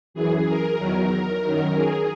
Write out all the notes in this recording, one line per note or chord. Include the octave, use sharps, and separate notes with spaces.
F#2 E3 G#4
A#4
E2 D#3 F#3
F#2 D#3 F#3
G#4